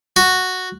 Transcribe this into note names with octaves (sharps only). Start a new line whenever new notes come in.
F#4